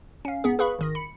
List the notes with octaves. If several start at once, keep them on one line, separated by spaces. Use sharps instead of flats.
C#4 F5
G#2 B3 G#4
G#4 B4 F5 B5 C#6
G#1 D#3 A#6
B5 C#7